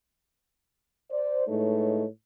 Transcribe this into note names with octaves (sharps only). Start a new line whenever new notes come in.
C5 D5
A2 G#3 A3 D#4 B4 C#5